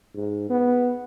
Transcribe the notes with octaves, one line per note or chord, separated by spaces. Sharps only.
G#2
B3